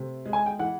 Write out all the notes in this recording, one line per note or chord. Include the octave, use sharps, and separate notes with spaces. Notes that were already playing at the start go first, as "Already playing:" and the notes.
Already playing: C3 A3
G#3
G#5
G5
E3 F#5